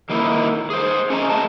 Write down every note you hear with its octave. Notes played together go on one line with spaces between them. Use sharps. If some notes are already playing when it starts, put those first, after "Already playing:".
D#3 A#3 D#4 E4
G#4 C5
C#4 G#4 D#5 F#5 A#5
F#3 A3 D#5 A5